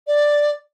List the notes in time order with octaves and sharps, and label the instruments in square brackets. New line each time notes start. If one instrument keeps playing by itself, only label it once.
[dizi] D5